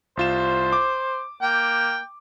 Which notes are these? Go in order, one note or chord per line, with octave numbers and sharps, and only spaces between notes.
C2 F4 C5 E7
D6
A#3 G5